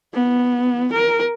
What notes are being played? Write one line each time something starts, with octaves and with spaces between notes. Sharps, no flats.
B3
A#4